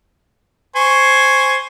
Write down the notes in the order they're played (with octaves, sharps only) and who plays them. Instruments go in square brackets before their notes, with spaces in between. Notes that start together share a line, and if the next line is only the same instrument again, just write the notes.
[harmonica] C5 G#5 C#6